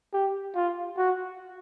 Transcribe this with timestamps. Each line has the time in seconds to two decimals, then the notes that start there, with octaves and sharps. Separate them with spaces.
0.14 G4
0.55 F4
0.98 F#4